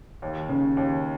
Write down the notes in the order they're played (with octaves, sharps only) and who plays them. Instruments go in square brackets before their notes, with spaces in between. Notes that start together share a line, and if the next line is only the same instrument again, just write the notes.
[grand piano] D#2
C#3
D#2